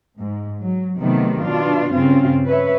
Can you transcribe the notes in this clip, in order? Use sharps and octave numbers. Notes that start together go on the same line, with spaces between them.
G#2
F#3
C3 D#3 F#3 A3 B3
B2 D4 F4
G2 C#3 C4 F4
B4 C#5 E5